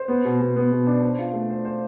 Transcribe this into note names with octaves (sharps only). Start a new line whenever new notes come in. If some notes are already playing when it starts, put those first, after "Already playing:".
Already playing: C5
B3
B2
B2
B3
B2
D4
C5
F4
A3
C5
C5